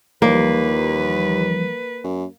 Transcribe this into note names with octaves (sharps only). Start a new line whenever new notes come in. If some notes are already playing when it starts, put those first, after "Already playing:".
D#2 E3 F3 G3 A#3 B4
F#2